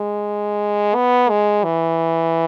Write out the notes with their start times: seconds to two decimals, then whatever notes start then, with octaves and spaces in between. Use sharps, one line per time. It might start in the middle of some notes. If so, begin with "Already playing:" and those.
Already playing: G#3
0.95 B3
1.30 G#3
1.64 E3